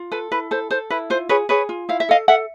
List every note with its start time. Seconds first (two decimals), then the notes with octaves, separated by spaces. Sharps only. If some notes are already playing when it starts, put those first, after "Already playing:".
Already playing: F4
0.12 A4 B4
0.32 E4 B4
0.51 A4 C5
0.71 A4 C5
0.90 E4 B4
1.10 F4 C5
1.29 G#4 B4 C#5
1.49 G#4 B4 C#5
1.69 F4
1.89 E4 F5
2.00 E5
2.09 A4 D#5 F5
2.28 A4 E5 F#5